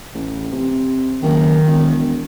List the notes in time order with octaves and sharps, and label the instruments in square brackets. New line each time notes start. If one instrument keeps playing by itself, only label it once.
[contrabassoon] A1
C3
[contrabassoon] F#1 [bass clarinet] D#3
[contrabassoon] E1